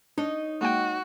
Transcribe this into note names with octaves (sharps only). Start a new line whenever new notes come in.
D4 D#4 C#5 D#5
G#3 A#3 F#4 G5